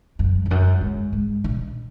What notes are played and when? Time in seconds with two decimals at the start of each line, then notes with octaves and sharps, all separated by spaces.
0.19 F#2
0.46 F2
0.51 F#2
0.81 G#2
1.13 G#2
1.44 B2